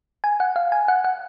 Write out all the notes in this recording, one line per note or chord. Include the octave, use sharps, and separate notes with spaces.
G#5
F#5
F5
G#5
F#5
F#5